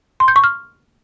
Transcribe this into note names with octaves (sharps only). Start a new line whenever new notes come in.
C6
G6
C#6
F6